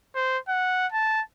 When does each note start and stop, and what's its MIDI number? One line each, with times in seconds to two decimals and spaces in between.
0.15 0.38 72
0.48 0.87 78
0.92 1.22 81